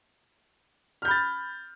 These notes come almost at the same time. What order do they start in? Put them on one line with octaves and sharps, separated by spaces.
F6 G6 B5 A6